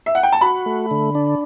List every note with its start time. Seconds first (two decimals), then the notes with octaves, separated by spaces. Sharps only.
0.06 E5
0.15 F#5
0.23 G5
0.32 A5
0.41 F#4 B5
0.66 A3
0.91 D3
1.15 D4